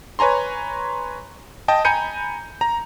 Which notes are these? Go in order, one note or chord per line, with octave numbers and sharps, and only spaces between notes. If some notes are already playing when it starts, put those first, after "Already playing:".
B4 C#5 G#5 A#5 C6
D#5 G5 A5
G#5 A#5 B5 G6 C#7 D#7
A#5